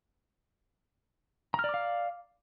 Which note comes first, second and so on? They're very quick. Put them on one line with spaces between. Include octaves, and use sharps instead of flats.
A#5 F6 D5 D6 F5